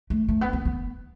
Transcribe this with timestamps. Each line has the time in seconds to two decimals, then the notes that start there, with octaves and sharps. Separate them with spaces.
0.10 A3
0.29 A3
0.41 B3
0.53 B3
0.65 B3